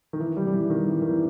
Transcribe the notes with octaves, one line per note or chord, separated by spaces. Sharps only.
D#3
E3
G3
G3
E3
D#3
E3
D#3
E3